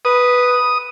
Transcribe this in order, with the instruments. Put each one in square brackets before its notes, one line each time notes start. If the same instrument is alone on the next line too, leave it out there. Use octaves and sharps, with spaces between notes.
[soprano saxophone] B4 [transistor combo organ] D#6